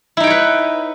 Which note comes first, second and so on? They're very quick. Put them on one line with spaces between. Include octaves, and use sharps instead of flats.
E4 D#4 G5 C#5 B4